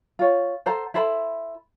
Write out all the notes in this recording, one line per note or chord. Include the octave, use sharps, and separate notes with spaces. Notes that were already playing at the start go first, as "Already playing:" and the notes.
F4 C#5
A4 C5 F#5 A#5
E4 A4 C5 B5